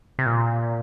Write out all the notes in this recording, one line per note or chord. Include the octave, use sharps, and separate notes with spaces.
C3
A#2